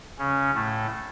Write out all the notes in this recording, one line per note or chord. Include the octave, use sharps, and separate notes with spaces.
C#3 C#4
A2 A3